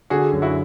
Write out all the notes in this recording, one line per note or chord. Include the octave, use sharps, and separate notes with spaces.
D3 F#4 G#4
F#2
E4 F#4